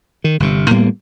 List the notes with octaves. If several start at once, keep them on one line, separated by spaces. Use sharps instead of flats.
D#3
G1 C3
A2 G3 A#3 B3